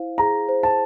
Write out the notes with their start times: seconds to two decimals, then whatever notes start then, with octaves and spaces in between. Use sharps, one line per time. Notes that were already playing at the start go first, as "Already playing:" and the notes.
Already playing: E4 C5 F5
0.18 G#4 A#5
0.49 C5
0.63 A5